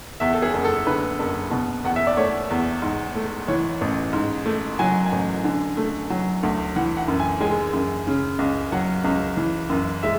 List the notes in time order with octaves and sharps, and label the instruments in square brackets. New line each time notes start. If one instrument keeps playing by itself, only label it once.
[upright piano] E2 E5
A4
G#4
F#1
A4
D3 B4
F#1
B2
E2 F#5
E5
D5
A3 C#5
E2
G#2
A3
E3 C#5
A1
G#2
A3
F#3 G#5
G#5
A1
D3
A3
F#3
D2
E3 F#5
F#5
F#2
G#5
G#3 G#5
F#2
C#3
C#2
F#3 F#5
C#2
E3
F#2
G#3 E5